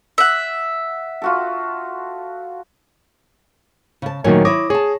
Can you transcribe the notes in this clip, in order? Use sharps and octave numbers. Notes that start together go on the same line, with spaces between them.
E5 F#5
F4 F#4 A4
C#3 A5
D2 A#2 D#3 F#3 C#5 G#5
E4 C#5 D6 D#6 A#6
G#4 C#5 A5